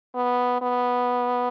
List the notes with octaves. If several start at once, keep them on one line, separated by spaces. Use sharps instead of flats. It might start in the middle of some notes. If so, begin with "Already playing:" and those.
B3
B3